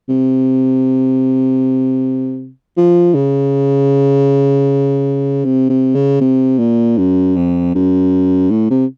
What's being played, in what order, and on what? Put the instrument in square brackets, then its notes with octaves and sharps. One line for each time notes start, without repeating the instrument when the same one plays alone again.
[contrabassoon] C3
F3
C#3
C3
C3
C#3
C3
A#2
F#2
F2
F#2
A2
C3